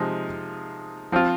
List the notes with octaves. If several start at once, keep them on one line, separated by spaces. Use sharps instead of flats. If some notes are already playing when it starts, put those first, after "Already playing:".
Already playing: C3 F3 G#3 D#4
F3 C4 F4